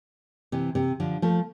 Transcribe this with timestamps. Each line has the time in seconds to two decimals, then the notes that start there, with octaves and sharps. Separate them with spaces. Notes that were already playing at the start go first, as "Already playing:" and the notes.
0.52 C3 E3
0.75 C3
1.00 D3 F3
1.22 F3 A3